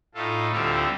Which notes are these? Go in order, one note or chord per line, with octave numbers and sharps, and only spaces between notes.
A2 A3 D#4 F4 A4
D2 D3 G3 C4 F4 A4